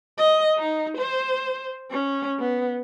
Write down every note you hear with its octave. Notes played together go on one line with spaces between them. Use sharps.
D#5
D#4
C5
C#4
B3